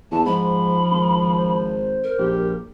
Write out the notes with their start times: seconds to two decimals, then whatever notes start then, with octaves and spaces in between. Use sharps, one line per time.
0.12 E2 E3 A5
0.26 G#2 F3 B5
0.91 G#1
1.37 C5
2.04 A#4
2.19 A#1 G4